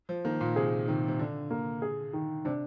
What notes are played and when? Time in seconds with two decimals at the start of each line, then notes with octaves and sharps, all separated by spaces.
0.09 F3
0.25 D#3 A#3
0.41 A#2
0.56 C3 G#4
0.88 C3 D#3
1.08 C3
1.19 D3 D4
1.50 A#3
1.82 G#4
2.13 D#3
2.45 C3 D4